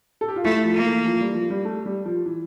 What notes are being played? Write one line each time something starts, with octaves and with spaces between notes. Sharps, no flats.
A4
G4
F4
A3 E4
F3
A#3
E3
F3
G3
F3
G3
A3
G3
F3
E3